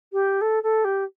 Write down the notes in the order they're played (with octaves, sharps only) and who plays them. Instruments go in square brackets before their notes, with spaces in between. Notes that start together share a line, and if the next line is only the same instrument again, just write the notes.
[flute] G4
A4
A4
G4